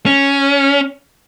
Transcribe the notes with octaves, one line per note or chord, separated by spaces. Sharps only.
C#4